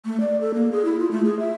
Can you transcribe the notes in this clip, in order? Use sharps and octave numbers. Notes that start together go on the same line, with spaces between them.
A3
D5
A4
A#3
G#4
E4
F4
A3
G#4
E5